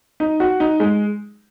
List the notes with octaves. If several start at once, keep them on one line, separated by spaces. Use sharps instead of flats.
D#4
F#4
D#4
G#3